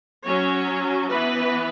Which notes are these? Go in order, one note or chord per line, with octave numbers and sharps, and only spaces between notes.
F#3 C#4 C#5
E3 B3 B4